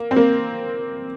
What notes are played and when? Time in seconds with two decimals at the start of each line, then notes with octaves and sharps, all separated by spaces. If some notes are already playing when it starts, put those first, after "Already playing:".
Already playing: A#3
0.11 C4
0.16 A#3